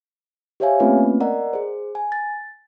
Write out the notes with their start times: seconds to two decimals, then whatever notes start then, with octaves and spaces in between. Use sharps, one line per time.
0.60 G4 C5 C#5 E5 F5 G#5
0.80 A3 A#3 C4 C#4 F4 B4
1.20 A#4 D5 D#5 F#5 A#5
1.53 G#4 C5
1.95 G#5
2.12 A6